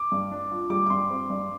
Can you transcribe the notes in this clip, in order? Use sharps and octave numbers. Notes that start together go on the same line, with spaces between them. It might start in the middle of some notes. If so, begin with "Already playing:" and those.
Already playing: D6
G2
D4
F4
G3 D6
D6
G2 C6
C4
G2